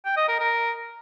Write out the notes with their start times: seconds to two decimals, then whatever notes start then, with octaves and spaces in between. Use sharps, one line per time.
0.05 G5
0.17 D#5
0.29 A#4
0.40 A#4